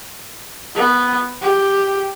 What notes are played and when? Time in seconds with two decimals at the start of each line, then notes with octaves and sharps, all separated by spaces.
0.75 B3
1.42 G4